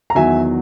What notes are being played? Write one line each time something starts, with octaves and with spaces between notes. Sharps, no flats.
A#5
E2 D#3 F#3 E5 G#5